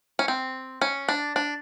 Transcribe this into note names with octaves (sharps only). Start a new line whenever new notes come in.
C#4
C4
C#4
D4
D4